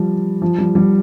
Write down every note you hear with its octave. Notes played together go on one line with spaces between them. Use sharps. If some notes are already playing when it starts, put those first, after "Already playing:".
Already playing: F3 G3
F3
G3
G3